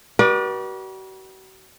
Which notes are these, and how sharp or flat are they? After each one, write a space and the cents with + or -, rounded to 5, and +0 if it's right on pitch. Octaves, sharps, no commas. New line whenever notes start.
F#4 +45 B4 -40 D5 +20